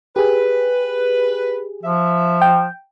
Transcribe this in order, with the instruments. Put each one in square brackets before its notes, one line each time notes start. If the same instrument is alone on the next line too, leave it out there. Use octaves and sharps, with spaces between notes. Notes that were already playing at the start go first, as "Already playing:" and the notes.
[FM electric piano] G4 G#4 [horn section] B4
[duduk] F3 [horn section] E5
[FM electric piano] G5